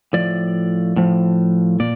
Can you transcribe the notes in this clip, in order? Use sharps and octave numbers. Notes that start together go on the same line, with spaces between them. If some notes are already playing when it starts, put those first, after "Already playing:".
A2 F3 D5
A2 F3
A#2 D5